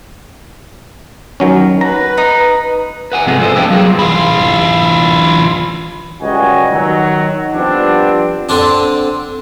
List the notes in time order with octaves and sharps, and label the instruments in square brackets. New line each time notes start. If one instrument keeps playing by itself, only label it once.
[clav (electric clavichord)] D#3 F#3 C#4
[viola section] B4 [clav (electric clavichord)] A#5
[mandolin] D#4
[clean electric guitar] B4 F#5 G#5
G#2 C3 F3 G#3 A3 B3
A4 C5 D5 D#5
A3 D4 G4 B4 F5 G5
F#3 G3 F4 G#4 A#4
[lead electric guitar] E3 F4
[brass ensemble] C#2 F#2 G3 F#4 D#5 G#5
D#3 F#3
F3 G3 B3 C4 D4
[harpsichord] D3 C4 D4